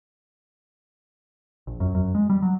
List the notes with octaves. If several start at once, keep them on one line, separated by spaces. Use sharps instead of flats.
A#1
F#2
F#2
G#3
G3
F#3